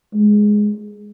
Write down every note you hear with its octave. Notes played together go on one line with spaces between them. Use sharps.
G#3